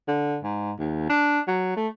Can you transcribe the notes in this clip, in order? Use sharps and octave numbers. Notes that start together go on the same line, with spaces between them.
D3
G#2
D#2
D4
F#3
A3